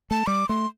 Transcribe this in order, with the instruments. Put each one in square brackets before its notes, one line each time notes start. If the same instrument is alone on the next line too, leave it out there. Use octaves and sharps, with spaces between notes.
[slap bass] A3 [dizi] A5
[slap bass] G3 [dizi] D6
[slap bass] A3 [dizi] C6